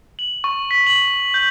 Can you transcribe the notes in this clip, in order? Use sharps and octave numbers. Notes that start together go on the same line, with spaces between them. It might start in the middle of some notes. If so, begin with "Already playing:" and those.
F#7
C#6
B6
F#7
G6